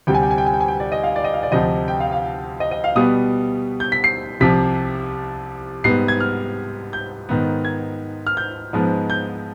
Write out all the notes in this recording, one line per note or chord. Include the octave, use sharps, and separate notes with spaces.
D2 C3 G3 G5
G#5
G5
G#5
G5
G#5
G5
G#5
G5
D5
D#5
F5
D5
D#5
F5
D5
D2 C3 F3 D#5
G5
F5
F5
D#5
D#5
F5
B2 G3 B3 D#6
G6
B6
C7
C2 C3 F3 B6
G#2 G3 B3 C7
G#6
F6
G6
G#2 D#3 B3
G#6
F6
G6
G#2 F3 G#3 B3
G6